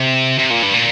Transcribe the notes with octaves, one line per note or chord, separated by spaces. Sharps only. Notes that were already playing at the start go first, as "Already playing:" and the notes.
Already playing: C3
C3
A#2
G2
A#2